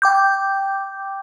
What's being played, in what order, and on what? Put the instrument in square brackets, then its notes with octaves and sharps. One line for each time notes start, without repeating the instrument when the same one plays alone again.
[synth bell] G5 D6 G6